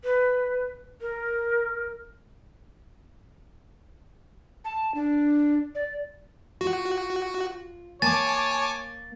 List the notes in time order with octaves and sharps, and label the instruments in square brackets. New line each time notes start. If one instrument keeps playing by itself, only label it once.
[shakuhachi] B4
A#4
[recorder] A5
D4
D5
[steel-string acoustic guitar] F4 [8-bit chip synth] F#4
[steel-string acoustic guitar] A#3 [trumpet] C#5 [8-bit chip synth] G#5 A5 D6 [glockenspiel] A6